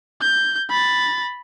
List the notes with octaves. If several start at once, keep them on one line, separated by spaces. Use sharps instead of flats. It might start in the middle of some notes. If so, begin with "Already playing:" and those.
G6
B5 A6